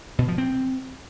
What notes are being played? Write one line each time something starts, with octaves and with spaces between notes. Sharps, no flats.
B2
F3
C4